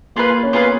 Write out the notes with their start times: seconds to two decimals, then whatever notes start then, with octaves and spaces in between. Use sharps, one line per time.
0.16 A#3 F4 G#4 B4 F5
0.43 C#4
0.53 B3 F4 G#4 B4 F5